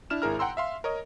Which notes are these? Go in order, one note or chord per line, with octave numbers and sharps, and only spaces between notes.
D4 E4 F6 E7
G#1 E4 G#4 A#4 A#5 F6
F#5 G5 A#5 C6 E6
E5 F5 C6
A#4 C#5 D#5